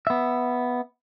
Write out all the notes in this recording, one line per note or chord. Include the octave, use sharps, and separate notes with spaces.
B3 E5